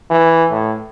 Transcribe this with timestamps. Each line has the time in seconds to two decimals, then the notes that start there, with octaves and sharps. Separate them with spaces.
0.10 E3
0.51 A2